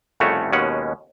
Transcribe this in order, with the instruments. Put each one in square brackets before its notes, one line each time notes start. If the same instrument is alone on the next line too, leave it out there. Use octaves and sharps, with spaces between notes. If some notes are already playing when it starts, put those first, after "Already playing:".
[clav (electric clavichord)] C2 F2 C#3 A3 F#4 C#5
D#2 B2 G#3 C#4 F#5